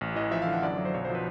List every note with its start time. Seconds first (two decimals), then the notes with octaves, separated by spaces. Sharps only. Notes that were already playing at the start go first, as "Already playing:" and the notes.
0.01 A1
0.15 E3 D#5
0.31 F3 E5
0.42 D3 F5
0.53 F#5
0.62 F#2 D5
0.78 F#3
0.85 C5
0.94 B1 C#5
1.05 F3 C5
1.15 B4